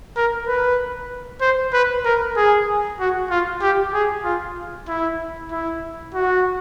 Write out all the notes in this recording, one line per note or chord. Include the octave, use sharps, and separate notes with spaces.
A#4
B4
C5
B4
A#4
G#4
F#4
F4
G4
G#4
F4
E4
E4
F#4